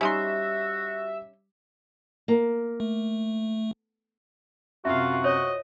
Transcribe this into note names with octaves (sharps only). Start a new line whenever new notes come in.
G3 C#4 D#4 F#4 E5 C6
A#3
A3
F#2 C3 F4 F#4 E5 F5
C5 C#5 D#5